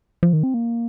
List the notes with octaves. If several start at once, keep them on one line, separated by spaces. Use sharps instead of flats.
F3
D#3
C4
A#3